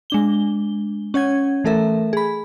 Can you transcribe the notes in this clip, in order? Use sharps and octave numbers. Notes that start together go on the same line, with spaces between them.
G#3 D4 G7
C#4 C#5 F#5 G#6
E3 A3 A4 A#4 E5
G#4 B5